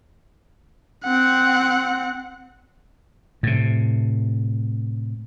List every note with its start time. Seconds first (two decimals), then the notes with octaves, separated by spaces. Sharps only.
1.04 C4 F#5
3.43 A2 C3